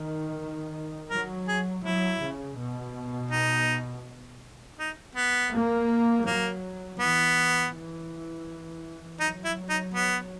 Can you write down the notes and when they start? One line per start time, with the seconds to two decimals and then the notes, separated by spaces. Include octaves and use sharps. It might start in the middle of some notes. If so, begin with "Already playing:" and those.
Already playing: D#3
1.10 F#3 A#4
1.48 G#4
1.84 F#3 E4
2.21 C#3
2.58 B2
3.31 D#4
4.79 D#4
5.15 B3
5.52 A#3
6.25 F#3 A#3
7.00 E3 B3
7.74 E3
9.20 F#3 D#4
9.44 E4
9.70 D#4
9.94 B3